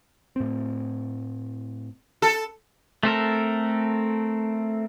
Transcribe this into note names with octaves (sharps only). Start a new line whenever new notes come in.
A2 C4
A4
A3 C4 A4 A#4